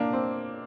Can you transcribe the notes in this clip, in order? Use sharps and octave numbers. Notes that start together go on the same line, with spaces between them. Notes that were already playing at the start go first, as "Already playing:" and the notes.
Already playing: A#3 D4
C4